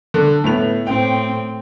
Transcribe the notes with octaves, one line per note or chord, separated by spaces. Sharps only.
D3
A2 B3 F7
A2 C4 G5